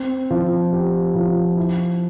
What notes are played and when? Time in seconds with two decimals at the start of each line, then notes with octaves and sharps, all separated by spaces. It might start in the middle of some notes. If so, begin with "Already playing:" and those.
Already playing: C4
0.31 F3
0.72 G4
1.15 F3
1.57 E4